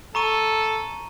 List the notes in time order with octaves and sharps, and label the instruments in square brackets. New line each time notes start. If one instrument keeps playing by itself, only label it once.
[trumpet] A4 [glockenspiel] A#5 C#6 D#7